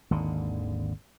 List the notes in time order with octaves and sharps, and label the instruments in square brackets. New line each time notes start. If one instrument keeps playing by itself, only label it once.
[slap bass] G#1 D#2 D3